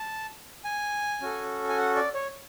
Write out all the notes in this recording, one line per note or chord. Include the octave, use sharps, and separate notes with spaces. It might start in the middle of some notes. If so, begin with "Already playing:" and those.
Already playing: A5
G#5
C#4 F#4 A4
G#5
F#5
D5
C#5